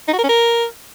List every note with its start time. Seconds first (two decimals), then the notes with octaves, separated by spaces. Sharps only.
0.08 D#4
0.13 F#4
0.18 A#4
0.24 C#4
0.29 A#4